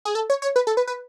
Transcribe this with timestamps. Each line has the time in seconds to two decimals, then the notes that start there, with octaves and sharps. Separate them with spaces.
0.05 G#4
0.15 A4
0.30 C#5
0.42 C#5
0.56 B4
0.67 A4
0.77 B4
0.87 B4